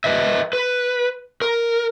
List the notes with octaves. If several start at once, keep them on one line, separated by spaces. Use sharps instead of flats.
B4 D#5 E5
B4
A#4